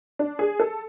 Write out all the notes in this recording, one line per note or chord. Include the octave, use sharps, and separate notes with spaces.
D4
G#4
A4